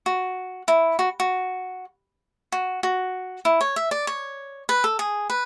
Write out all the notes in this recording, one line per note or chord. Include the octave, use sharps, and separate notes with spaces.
F#4
E4
F#4
F#4
F#4
F#4
E4
C#5
E5
D5
C#5
B4
A4
G#4
B4